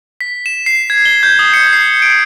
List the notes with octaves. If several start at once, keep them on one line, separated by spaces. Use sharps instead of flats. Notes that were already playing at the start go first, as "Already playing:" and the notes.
B6
E7
C7
G#6
G7
G6
D#6
C#7
C7
D7